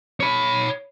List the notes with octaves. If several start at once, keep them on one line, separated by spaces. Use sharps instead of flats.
C#5 B5